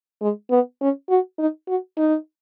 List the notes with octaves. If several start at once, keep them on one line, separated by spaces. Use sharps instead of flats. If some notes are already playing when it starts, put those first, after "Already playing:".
G#3
B3
C#4
F#4
D#4
F#4
D#4